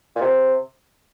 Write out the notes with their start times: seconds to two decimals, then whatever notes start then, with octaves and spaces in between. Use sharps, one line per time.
0.16 A#2
0.21 C3